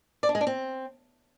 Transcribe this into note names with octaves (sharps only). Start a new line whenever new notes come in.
D5
D4
G#3
D4
C4